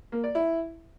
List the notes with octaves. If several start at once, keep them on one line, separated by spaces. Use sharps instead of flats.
A#3
D5
E4